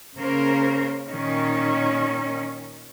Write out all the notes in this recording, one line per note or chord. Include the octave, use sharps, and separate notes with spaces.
C#3 A#3 C#4 A#4 C5
A#2 D#3 C#4